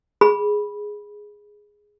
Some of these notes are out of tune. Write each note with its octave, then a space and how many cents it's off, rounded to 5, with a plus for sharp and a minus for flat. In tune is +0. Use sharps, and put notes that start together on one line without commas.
G#4 +0 B5 -15